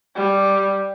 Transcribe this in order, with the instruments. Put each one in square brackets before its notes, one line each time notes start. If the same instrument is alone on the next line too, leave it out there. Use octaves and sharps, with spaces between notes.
[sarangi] G3